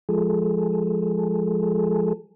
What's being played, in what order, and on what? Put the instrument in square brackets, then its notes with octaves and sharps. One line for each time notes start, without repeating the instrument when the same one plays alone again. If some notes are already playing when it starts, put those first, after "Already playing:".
[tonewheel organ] F3 G#3 G#4 A4